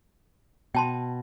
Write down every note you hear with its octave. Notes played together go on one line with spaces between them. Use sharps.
B2 G5 A5 C6